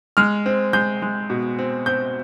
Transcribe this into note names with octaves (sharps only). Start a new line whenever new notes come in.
G#3 F6
C4
G#3 G6
G#3
B2
C4
C4 G6